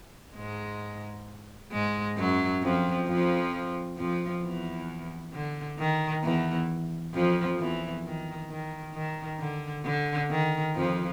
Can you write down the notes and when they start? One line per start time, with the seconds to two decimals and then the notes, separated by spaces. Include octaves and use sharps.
0.36 G#2 G#3
1.72 G#2 G#3
2.17 F#2 F#3
2.63 F2 F3
3.07 F2 F3
3.97 F2 F3
4.43 E2 E3
5.34 D3
5.79 D#3
6.23 E2 E3
7.14 F2 F3
7.59 E2 E3
8.05 D#3
8.50 D#3
8.95 D#3
9.40 D3
9.85 D3
10.31 D#3
10.76 F2 F3